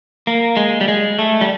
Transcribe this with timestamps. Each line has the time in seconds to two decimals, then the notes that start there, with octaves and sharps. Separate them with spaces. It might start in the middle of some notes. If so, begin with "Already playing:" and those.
0.27 A#3
0.57 G#3
0.81 G3
0.88 G#3
1.19 A3
1.41 G3